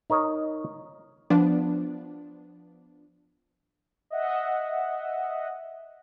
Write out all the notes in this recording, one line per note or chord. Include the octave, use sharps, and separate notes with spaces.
D#4 A#4 C#5 D#5
F3 B3 D4
D#5 E5 F#5